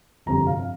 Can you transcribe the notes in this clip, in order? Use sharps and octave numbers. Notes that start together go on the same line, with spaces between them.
G1 F2 C3 A#5
F5